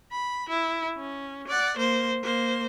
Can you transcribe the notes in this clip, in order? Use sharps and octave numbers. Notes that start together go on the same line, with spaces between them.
B5
E4
C#4
D5 F#5
A#3 C5
A#3 C5